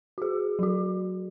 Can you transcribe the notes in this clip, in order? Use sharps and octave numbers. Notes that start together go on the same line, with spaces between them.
F#4 G#4
F#3 F#4